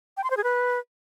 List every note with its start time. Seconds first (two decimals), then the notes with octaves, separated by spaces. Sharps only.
0.17 G5
0.24 C6
0.30 C5
0.37 G#4
0.44 B4